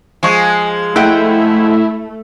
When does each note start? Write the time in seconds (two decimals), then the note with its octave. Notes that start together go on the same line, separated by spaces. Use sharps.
0.23 F3 G#3 G#5 C#6
0.96 A3 E4 D#5 F#5 G5